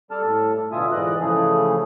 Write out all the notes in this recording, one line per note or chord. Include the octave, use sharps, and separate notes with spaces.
G3 A4 D5 A5 F6
A2 A4
B2 D3 F4 E5 G#5 D#6
G#2 E3 D5 D#5 F#6
C#3 E3 F3 A3 G#4